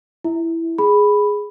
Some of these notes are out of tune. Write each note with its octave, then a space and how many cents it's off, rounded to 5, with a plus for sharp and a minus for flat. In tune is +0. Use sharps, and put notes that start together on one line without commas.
E4 +0 E5 -15
G#4 +0 B5 +0